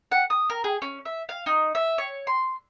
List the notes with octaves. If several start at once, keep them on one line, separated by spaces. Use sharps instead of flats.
F#5
D#6
A#4
G#4
C#4
E5
F5
D#4
E5
C#5
C6